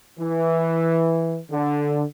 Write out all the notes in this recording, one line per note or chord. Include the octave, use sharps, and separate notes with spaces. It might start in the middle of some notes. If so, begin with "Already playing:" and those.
E3
D3